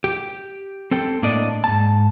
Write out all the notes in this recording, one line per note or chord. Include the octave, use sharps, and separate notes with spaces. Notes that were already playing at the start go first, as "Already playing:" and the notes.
G4
C4 A4 G5
A2 A#3 D4 D5 D#5
G#2 A5